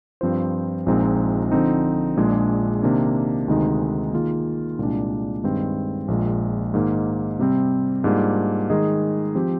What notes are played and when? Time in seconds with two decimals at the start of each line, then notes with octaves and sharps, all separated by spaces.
0.21 G2 F3 C4 F4 C5
0.86 A#1 A#2 G#3 C4 D#4
1.52 D3 F3 C4 D#4
2.17 A#1 A#2 G#3 D4 G#4
2.83 C3 D#3 A#3 D4
3.48 D2 C3 D#3 G#3 D#4
4.13 D#3 A#3 F4 G#4
4.79 C2 A#2 G#3 D4
5.44 G2 D#3 G#3 C4
6.08 A#1 A#2 G#3
6.74 G#2 D#3 A#3
7.39 C3 G3 C4
8.04 G#2 G3 A#3 D4 F4
8.70 D#3 G#3 D#4 G#4 D#5
9.35 F3 C4 G4